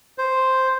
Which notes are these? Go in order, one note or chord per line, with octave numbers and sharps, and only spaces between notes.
C5